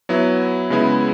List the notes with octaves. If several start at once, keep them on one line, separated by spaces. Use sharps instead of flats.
F#3 B3 E4
C#3 G#3 B3 E4